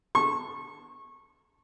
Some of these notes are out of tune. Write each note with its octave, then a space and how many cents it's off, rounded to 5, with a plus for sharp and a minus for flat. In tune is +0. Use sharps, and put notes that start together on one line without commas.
A5 +0 C#6 -25